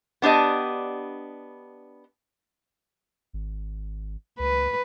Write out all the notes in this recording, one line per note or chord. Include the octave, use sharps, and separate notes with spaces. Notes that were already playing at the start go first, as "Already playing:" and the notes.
B3 D4 G4 D#5
G#1
C#2 B4